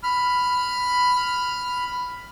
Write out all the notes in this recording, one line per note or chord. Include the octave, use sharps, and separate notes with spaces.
B5 F6